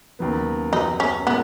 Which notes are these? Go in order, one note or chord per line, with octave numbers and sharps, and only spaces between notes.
D#2 C#3 F#3 B3
F#2 C#3 F#3 B3 D#4 F#4
C#4
A#2 G#3 B3 C#4